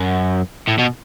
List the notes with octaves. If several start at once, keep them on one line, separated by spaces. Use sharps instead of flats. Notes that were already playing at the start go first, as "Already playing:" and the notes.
Already playing: F#2
A2
B2